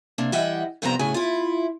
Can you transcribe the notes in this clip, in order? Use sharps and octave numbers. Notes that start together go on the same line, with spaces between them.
C3 A#3 D4
E3 G3 D#5 E5 F#5 G5
G2 C3 F3 B3 C5 A#5
A2 C#3 F#4 G#5
E4 F4